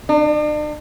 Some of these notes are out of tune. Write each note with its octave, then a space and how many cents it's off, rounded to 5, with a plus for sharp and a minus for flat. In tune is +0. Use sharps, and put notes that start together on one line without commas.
D4 +40